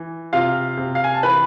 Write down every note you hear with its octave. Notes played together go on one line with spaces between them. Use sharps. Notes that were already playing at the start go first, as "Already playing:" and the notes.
Already playing: E3
C3 F4 F5
C3
F5
G#5
A5
E3 B4 B5